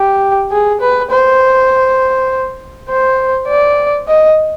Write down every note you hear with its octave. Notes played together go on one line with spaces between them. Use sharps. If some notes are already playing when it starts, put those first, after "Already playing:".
Already playing: G4
G#4
B4
C5
C5
D5
D#5